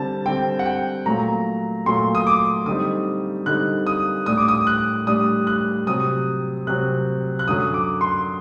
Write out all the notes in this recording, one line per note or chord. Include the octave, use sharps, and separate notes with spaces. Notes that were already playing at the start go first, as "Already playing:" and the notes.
Already playing: D3 G3 C4 A5
D3 G3 C4 G5
F#5
G5
A#2 F#3 A3 A#5
A#2 F#3 A3 C6
D#6
D6
D3 G3 C4 D#4 D#6
D3 G3 C4 D#4 F#6
D#6
A2 G3 D4 D#6
D6
D#6
F#6
A2 G3 D4 D#6
F#6
C3 F#3 C4 D#6
C3 F#3 C4 F#6
F#6
F#2 D3 F#3 D#6
D6
C6